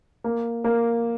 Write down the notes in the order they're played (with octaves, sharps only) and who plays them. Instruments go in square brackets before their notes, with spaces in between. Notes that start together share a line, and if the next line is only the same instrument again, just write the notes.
[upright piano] A#3
A#3